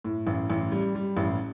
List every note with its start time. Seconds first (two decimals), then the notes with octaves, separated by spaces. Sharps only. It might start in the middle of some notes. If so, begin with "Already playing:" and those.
0.04 A2
0.27 A1
0.50 A1
0.72 G3
0.95 G3
1.17 A1